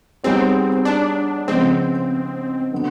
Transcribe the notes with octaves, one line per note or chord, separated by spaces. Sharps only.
G3 B3 C4 D#4 G#4 C#5
D4
C#3 F3 G#3 B3 C4
D3 F#3 B3